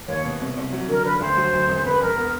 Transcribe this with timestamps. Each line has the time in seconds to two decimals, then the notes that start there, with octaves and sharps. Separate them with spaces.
0.08 D#2 C#5
0.25 B2
0.40 C2
0.57 C2
0.73 F#3
0.88 D3 A#4
1.05 D3 B4
1.21 D2 C5
1.37 F#3
1.53 D2
1.69 E1
1.85 E1 B4
2.01 E1 A#4
2.17 B3